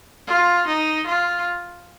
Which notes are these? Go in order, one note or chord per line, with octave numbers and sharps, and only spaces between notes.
F4
D#4
F4